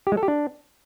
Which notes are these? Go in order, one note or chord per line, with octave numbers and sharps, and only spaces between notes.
G4
G#3
A4
G4
D4